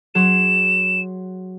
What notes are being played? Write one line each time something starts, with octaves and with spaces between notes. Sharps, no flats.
F#3 G#4 C6 E7